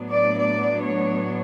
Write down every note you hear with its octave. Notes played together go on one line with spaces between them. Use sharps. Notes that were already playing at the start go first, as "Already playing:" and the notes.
Already playing: A2 F#3 B3 D4
D5
D5
C#5